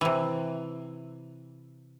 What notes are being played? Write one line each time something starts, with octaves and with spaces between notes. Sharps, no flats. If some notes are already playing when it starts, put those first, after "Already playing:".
C3 E3